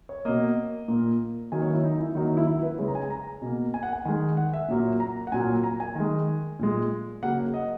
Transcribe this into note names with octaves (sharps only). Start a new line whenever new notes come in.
C#5
B2 A#3 D#5
A#2 A#3
D#3 F#3 A#3 G#5
C#5
E4
D#4
E4
D#3 F#3 A#3 D#4
D#4
E4
E4
B4
C#3 G#3 C#5
A#5
G#5
A#5
B2 A#3
G#5
F#5
G#5
D#3 G#3 G#5
F#5
E5
A#2 F#3 A#3
A#5
F#5
A#2 F#3 A#3 G#5
A#5
G#5
D#3 G#3
A#2 G#3
C#3 F#3 A#3 F#5
D#5